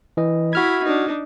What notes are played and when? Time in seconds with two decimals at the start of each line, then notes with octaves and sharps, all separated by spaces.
0.17 E3 D#5
0.53 E4 F#4 B5 F6 G#6
0.84 D4 D#4